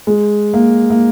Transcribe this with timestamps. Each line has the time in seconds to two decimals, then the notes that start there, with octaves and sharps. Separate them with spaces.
0.07 G#3
0.54 A#3
0.90 A#3